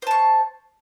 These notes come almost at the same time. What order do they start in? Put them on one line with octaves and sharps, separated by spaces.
C5 A5 C#6